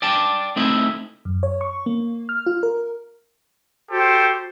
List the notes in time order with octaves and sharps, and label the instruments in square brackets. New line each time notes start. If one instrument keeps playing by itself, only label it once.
[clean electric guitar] D5 G5 A5
A3 C4 D#4 E4
[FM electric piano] F#2
C#5
C#6
A#3
F6
F4
A#4
[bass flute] F#4 [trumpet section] G4 A4 C5